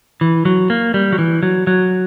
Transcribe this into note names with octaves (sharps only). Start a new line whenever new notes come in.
E3
F#3
A#3
G3
F#3
E3
F#3
F#3